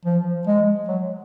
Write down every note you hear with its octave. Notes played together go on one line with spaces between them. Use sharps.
F3
G#3
F#3